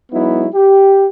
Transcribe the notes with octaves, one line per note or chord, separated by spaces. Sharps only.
F#3 G#3 B3 D#4 E4
G4